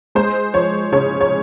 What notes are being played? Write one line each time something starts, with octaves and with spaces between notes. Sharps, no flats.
G#3 C5
F3 C#5
C#3 C#5
C#5